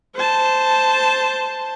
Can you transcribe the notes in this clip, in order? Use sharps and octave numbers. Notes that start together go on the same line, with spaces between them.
C5 A5